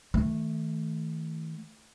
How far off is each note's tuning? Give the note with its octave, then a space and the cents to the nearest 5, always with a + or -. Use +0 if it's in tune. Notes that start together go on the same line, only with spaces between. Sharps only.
D#3 +45 A3 +0